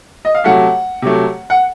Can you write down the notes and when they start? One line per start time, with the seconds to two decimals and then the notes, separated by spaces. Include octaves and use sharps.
0.25 D#5
0.35 F5
0.44 C3 F#3 A3 F#5
1.02 C3 F#3 A3
1.50 F#5